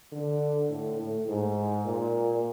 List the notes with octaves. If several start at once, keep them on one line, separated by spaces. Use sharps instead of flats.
D3
A2
A2
G#2
A#2